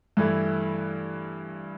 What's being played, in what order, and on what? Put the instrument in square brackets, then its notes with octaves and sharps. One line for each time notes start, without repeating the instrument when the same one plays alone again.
[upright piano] G2 E3 A3 E4